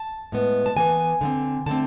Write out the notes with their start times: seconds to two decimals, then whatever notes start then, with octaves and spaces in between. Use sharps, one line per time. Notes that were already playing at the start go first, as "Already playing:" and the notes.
Already playing: A5
0.32 A2 G#3 B3
0.66 A5
0.77 E3 B3 G#5
1.21 D3 A3 C4
1.66 D3 A3 C4 A5